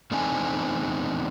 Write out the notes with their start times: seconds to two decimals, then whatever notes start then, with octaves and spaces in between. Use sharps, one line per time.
0.11 E2 A3 C4 D4 D#4 G#5